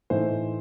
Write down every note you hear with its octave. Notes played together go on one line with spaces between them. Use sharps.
A2 E3 A3 D#4 C5